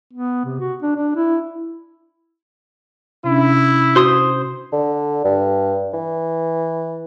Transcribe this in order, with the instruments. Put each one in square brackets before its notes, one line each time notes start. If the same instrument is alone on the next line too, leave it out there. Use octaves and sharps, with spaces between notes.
[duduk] B3
C3
F#4
D4
D4
E4
[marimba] C3 C#4 D4 [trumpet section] E4
[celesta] F#4 [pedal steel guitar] C5 C6 D#6
[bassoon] D3
G2
E3